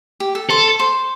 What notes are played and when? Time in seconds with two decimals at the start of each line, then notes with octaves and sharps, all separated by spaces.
0.20 G4
0.35 A4
0.50 A4 C5
0.80 C5